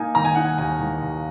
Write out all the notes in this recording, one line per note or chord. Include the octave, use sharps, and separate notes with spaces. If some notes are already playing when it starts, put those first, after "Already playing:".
Already playing: A#3 D#4 G#5
D#3 A#5
G#5
D#4 F#5
G#5
D#2 G#5
D#3
D#2